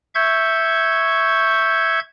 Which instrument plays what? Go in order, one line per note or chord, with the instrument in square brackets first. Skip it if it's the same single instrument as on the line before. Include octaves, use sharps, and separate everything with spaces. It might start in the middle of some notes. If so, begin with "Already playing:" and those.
[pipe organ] E5 C#6 G6 G#6